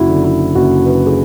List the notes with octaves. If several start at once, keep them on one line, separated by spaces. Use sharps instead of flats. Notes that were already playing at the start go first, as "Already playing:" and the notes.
Already playing: F#1 E4 F#4
D3
E4
F#1 F#4
B4
G#4